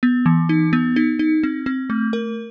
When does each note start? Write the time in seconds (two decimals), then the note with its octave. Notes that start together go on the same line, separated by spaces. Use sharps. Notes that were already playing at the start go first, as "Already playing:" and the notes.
0.03 B3
0.26 E3
0.49 D#4
0.73 B3
0.96 D#4
1.19 D#4
1.43 C4
1.66 C4
1.90 A3
2.13 A#4